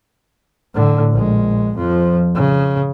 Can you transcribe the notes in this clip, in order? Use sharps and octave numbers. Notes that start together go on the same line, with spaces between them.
A2 D3
A#1 G#3
F2 F3
C#3